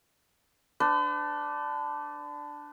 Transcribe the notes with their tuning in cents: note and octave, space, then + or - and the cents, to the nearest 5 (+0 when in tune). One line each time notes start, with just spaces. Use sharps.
D4 +0 B4 +45